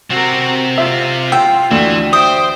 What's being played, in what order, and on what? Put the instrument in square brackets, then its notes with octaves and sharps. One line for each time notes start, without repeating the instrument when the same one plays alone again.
[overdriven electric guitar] C3 C4 [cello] F#4 A#4
[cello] F4 [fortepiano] E5
[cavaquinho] G5 [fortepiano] E6
[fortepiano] D2 [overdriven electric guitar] E3
[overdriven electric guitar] C5 [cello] E5 G5 [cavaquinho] D#6